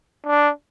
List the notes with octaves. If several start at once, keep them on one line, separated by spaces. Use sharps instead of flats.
D4